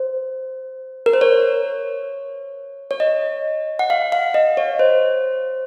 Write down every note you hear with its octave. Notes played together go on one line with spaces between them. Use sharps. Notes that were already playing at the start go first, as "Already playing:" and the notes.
Already playing: C5
A#4
C5
C#5
C#5
D#5
F#5
F5
F5
D#5
C#5
C5